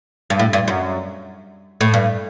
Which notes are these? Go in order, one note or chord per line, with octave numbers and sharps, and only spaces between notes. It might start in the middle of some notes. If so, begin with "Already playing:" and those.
G2
A2
G2
F#2
A2
G2